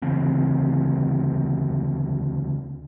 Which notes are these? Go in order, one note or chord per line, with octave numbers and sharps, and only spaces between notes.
D2 C#3 E3 C4